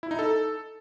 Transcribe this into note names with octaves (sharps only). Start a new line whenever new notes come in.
E4
D#4
A4